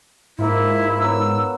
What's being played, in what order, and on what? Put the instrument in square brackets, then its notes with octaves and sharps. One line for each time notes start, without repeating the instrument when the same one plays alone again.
[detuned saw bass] G#2 [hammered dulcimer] A#3 F4 [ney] E4
[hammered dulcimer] F#3 B3 A#4 [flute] E6